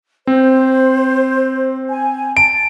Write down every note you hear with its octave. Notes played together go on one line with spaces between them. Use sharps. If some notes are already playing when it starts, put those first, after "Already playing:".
C4 C5
G#5
A5 D7